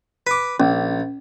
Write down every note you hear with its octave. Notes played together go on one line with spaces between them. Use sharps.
B4 D6
A#1 C#4